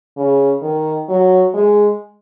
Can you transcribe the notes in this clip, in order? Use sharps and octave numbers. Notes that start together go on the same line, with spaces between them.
C#3
D#3
F#3
G#3